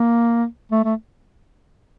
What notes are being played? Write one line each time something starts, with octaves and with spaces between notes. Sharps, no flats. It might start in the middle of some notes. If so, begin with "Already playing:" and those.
Already playing: A#3
A3
A3